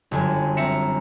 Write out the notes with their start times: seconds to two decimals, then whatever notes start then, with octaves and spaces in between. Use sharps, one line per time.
0.11 G1 F#2 G#5
0.57 C4 E5 A#5 C#7